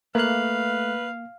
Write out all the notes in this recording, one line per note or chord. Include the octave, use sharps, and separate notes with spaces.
A3 A#3 B4 F5 F#6